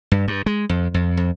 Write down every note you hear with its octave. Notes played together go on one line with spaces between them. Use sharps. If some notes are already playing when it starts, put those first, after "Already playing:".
G2
G2
G#3
F2
F2
F2